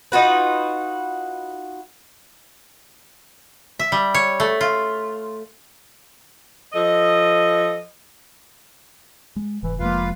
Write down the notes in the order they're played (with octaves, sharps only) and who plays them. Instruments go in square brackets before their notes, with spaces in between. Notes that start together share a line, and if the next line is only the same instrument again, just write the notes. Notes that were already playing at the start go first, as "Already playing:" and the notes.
[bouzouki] D#4 F4 F#4 B4
[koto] E5
G3
C#5
A3
F4
[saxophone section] F3 A4 D#5
[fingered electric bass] G#3
[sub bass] F1 [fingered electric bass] G#2 [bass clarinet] E3
[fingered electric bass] F2 F3 G#3 [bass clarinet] A#3 [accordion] F4 B4 F5